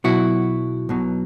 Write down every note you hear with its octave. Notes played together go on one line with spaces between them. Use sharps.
B1 B2 F#3 E4 F#4
B1 B2 F#3